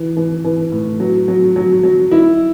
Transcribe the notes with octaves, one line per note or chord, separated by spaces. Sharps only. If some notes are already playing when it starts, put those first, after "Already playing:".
Already playing: E3
E3
E3
A2
F#3
F#3
F#3
F#3
E4